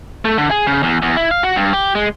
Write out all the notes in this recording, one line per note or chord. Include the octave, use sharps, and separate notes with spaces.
A3
D3
G#4
C#3
E2
E2
E4
F5
F#4
G2
G4
G#3